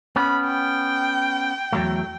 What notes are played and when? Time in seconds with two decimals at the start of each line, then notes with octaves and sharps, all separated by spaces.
0.16 B3 C#4 B5
0.46 G5
1.73 E2 F#3 A3